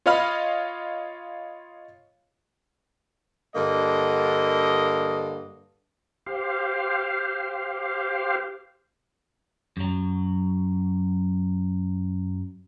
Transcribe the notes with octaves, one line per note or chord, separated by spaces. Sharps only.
F4 C#5 D#5 F5 B5 F6
G2 D3 A#3 D#5
G4 C5 F5
F#2 F#3